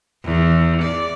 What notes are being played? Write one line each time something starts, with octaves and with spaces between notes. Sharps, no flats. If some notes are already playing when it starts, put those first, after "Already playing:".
E2
D5